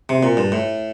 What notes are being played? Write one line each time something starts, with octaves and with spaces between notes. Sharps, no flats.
C3
A#2
G2
A2